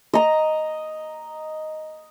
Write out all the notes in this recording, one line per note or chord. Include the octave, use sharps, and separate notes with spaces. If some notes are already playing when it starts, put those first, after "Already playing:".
D#5 A#5